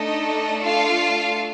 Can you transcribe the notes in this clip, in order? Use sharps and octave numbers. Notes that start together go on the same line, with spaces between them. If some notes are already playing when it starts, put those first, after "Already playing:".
Already playing: A3 D4 D#4 A4 D#5
F4 F5